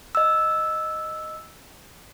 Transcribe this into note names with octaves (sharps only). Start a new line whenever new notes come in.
D#5 E6